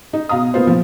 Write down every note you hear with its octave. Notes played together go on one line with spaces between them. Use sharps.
D#4
B2 F5 A#5 D#6
A#3 B3 F4 C5
A#2 F3